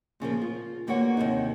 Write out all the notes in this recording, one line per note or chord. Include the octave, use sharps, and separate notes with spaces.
A#2 C#3 F3 A#3
F4
E2 D3 A#3 F#4 C#5 F#5
D#2 C3 A#3 D#4